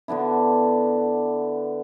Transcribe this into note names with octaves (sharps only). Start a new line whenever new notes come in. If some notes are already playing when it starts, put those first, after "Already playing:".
D3 B3 D4 E4